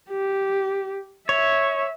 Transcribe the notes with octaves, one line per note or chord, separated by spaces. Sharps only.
G4
C#5 E5